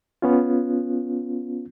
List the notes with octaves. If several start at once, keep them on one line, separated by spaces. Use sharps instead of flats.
B3 C#4 F4